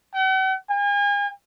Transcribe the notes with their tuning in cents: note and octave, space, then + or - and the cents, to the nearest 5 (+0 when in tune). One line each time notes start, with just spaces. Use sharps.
F#5 +45
G#5 -40